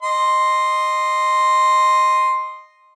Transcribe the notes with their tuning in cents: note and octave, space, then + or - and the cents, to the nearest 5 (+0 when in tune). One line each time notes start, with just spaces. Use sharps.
D#5 -10 C6 +0